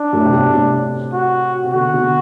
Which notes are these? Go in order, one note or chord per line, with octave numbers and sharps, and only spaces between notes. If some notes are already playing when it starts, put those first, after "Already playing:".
Already playing: D4
F#2 A2
C3
G2 B2
A2 C3
F#4
C3
B2 D3 F#4
C3
B2 D3